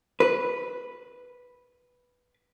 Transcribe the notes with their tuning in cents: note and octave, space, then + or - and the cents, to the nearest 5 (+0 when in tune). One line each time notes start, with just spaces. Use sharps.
B4 -5